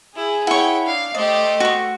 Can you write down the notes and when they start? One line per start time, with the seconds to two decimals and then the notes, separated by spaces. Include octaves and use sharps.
0.15 E4 G#4
0.47 E4 C#5 F#5 G5 C#6
0.86 D4 F5
1.15 A3 G4 C5 D5 D#5
1.60 F#4 C#6